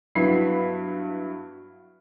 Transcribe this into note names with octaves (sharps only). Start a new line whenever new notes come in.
G2 F#3 B3 E4 B5 C7